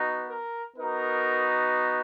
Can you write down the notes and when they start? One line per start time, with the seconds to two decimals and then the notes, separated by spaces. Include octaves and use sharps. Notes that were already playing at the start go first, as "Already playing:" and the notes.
Already playing: B3 D#4 F#4
0.29 A#4
0.77 B3 D#4 F#4 A#4